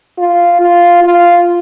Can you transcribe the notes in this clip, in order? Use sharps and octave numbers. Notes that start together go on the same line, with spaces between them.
F4
F4
F4